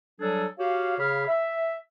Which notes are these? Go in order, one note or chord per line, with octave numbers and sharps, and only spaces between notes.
F#3 G3 D4 G#4 A4
F#4 G4 C#5 F5
C#3 G#4 C#5 F5 B5 F6
E5